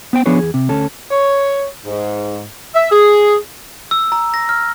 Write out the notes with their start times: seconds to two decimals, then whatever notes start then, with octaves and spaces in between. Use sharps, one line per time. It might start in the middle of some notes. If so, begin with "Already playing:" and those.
0.13 B3 C5 G5
0.26 F3 B3 D4 G#4 B4 C#5
0.39 E2 G#4
0.54 C3
0.69 D2 C#4 A4
1.11 C#5
1.86 G#2
2.75 E5
2.92 G#4
3.91 E6
4.12 A#5
4.34 A#6
4.49 F6